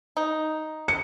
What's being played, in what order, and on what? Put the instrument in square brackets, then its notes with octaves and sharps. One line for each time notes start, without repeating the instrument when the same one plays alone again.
[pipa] D#4
[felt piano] C#7